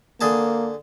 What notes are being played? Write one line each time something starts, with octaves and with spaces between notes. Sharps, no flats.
D3 A#3 G#4 A5